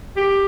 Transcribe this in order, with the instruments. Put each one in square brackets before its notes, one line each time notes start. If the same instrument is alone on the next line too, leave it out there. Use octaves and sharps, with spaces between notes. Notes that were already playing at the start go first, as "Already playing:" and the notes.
[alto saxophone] G4